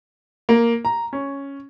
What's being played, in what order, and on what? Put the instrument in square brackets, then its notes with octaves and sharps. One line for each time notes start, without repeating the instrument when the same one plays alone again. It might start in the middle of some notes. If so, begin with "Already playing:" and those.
[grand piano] A#3
A#5
C#4